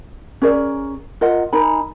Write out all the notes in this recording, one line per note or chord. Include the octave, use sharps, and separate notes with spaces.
C#4 G#4 A#4 D5
F4 A#4 D#5 F#5
D#4 A#4 G#5 B5